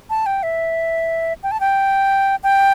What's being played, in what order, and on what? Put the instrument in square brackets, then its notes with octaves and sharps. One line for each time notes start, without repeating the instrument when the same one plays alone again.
[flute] A5
G5
E5
G5
A5
G5
G5